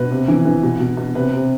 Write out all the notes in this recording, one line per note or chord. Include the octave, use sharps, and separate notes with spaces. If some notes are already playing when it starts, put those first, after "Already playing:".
Already playing: B2 B4
C3
E3
E3
B2
B2
B2
C3 B4
C3